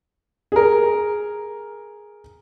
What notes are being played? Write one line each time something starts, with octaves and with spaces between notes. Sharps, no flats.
G#4 A#4